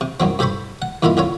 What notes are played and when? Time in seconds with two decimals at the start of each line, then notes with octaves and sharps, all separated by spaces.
0.01 C3
0.20 C2 F#2 F#3 C4
0.39 G2 G4 A4 C5 B5 C#6
0.82 F#5
1.03 G2 D3 D#3 A#3 E4 F4
1.17 C2 D3 F4 C#5